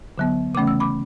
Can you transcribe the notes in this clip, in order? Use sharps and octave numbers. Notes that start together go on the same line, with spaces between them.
D3 F#3 B3
C#3 E3 A3 C#4 D6
E6
B5 D6